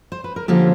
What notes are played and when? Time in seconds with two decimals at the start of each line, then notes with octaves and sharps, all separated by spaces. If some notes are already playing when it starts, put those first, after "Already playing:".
0.12 C5
0.24 B4
0.36 A#4
0.48 D3 F3 A#3 C#4 F4 G4 A4